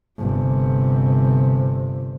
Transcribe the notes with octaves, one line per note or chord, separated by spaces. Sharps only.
G1 C3